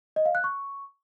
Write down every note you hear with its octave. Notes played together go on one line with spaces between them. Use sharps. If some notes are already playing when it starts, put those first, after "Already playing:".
D#5
F5
F#6
C#6